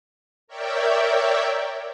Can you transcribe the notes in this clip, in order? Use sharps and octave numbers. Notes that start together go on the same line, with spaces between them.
A#4 C#5 D5 E5 G5